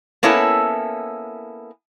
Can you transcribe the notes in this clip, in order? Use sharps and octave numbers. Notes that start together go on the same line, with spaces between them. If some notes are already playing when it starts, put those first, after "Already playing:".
A#3 B3 C#4 E4 A4